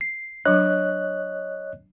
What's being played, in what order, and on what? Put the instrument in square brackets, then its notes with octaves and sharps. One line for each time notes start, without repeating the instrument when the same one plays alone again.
[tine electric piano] C7
[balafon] F#3 D4 [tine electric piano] C#5 D#5 F#6